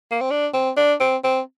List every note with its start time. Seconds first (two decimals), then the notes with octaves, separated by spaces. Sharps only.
0.11 A#3
0.21 C4
0.31 D4
0.54 C4
0.77 D4
1.00 C4
1.24 C4